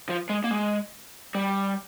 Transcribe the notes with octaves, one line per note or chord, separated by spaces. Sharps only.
F3
G#3
A#3
G#3
G3